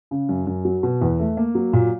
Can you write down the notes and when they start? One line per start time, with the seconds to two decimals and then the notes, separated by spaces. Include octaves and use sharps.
0.11 C#3
0.29 F#2
0.47 F#2
0.65 F#3
0.83 B2
1.01 E2
1.19 A3
1.37 A#3
1.55 F#3
1.73 A#2